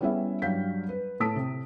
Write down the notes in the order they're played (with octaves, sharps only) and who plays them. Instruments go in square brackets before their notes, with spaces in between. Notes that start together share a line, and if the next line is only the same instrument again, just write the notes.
[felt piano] G3 B3 C#4 E4 G#4 E5
G2 F#3 G3 F5 G6 B6
B4
A2 A3 A5 D#6 B6 D7
C3